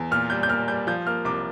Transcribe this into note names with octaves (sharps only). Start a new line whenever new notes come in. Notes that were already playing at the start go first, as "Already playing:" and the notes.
Already playing: E2
A#2 F6
G3 G6
G6
A#3 F6
G3 G6
F3 G6
A#3 F6
C2 D6